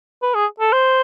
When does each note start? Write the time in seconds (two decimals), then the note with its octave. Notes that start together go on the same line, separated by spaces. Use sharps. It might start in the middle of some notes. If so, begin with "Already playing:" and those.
0.23 B4
0.34 G#4
0.60 A4
0.73 C5